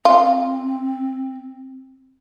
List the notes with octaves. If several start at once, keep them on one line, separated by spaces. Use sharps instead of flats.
C4 F4